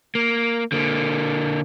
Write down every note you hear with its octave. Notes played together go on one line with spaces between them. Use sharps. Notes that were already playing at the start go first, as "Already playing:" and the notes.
A#3
D3 A#3